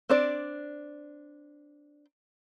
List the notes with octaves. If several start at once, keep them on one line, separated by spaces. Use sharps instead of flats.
C4 D4 D5